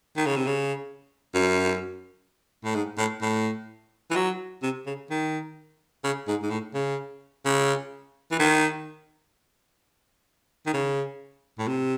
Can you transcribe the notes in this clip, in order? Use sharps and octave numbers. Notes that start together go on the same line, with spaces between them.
D#3
C#3
C3
C#3
F#2
A2
G#2
A2
A2
E3
F#3
C3
C#3
D#3
C#3
G#2
G#2
A2
C#3
C#3
E3
D#3
D#3
C#3
A2
C3